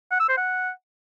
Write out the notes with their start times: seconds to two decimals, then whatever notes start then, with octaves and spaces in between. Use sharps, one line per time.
0.11 F#5
0.20 E6
0.29 C5
0.37 F#5